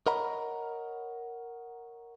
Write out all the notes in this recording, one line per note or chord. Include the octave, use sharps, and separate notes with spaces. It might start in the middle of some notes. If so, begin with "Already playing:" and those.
A#4 C#5 D#5 F#5 A#5 B5